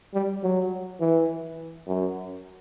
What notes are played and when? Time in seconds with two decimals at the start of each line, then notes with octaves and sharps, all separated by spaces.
0.14 G3
0.43 F#3
1.00 E3
1.87 F#2